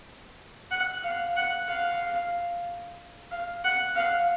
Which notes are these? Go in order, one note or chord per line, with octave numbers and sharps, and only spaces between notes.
F#5
F5
F#5
F5
F5
F#5
F5